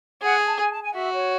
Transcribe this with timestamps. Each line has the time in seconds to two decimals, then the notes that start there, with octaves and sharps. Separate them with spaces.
0.22 G#4 F#5
0.46 A5
0.59 G#5
0.71 A5
0.82 G#5
0.94 F#4 E5
1.12 C#5